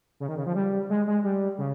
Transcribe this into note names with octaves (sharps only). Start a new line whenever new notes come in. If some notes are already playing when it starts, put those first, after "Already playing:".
C#3
D#3
C#3
F3
G3
G#3
G#3
G3
C#3